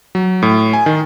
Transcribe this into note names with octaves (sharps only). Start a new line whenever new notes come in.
F#3
A2
G#5
D#3